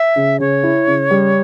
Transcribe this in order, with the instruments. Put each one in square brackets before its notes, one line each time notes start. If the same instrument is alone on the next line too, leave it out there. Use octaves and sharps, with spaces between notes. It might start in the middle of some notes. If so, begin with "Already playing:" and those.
Already playing: [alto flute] E5
[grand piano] C#3
[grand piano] C#3 [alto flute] C#5
[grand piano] E4
C#3
G3